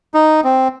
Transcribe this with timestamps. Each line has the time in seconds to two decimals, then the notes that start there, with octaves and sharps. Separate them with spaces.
0.14 D#4
0.44 C4